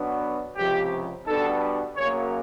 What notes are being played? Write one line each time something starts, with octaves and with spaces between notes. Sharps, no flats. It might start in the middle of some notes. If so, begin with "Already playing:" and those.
Already playing: B2 F#3 B3 D4
C#2 C3 F3 G4
B2 G3 B3 D4 A4
F#2 C#3 F#3 A#3 C#5